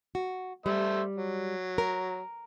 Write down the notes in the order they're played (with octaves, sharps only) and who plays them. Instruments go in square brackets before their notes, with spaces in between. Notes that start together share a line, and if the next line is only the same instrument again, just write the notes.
[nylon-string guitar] F#4
[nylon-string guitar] G3 [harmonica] A3 C5 E5
[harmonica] F#3
[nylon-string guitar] A#4